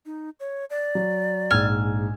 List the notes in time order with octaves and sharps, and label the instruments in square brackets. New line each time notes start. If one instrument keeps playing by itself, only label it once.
[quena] D#4
C#5
D5
[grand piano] F#3
[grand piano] A#1 G#2 E6 [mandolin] G#5 F6